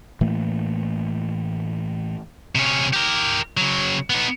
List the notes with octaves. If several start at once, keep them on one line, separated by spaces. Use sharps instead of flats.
A2 E3 A3 A#3
C3 C#4
G4 A#4
C#3 F#3
B3 D#4